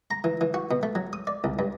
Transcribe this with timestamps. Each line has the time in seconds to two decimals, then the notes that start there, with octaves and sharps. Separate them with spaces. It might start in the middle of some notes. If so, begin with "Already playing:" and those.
0.11 A#5
0.24 E3
0.41 E3
0.54 F#4
0.71 B2
0.83 A3
0.95 F#3
1.13 D#6
1.27 D5
1.44 C2
1.59 G2